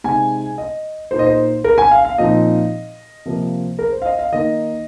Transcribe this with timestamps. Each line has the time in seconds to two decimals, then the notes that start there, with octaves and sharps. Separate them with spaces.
0.04 C3 G#3 D#4 G#5
0.58 D#5
1.11 A#2 A#3 D#4 C5
1.19 D#5
1.26 C5
1.64 A#4
1.78 G#5
1.91 F5
2.05 F5
2.18 A#2 F3 C4 D#4 D#5
3.25 C3 F3 A#3
3.79 A#4
3.92 C5
4.02 F5
4.06 D#5
4.19 F5
4.32 D#3 A#3 D#4 D#5